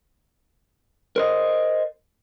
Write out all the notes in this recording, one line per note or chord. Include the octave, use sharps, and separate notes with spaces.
A#4 C5 D#5